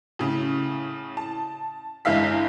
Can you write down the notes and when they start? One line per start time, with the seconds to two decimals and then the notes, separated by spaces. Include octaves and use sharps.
0.19 A2 C#3
1.17 A5
2.05 G1 E3 G#3 E4 F5 B6